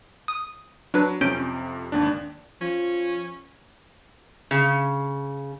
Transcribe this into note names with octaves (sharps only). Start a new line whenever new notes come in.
D#6
F#3 D4 B4
F2 C3 C#4 G6 D7
G#1 D#2 D4
F3 C#4
C#3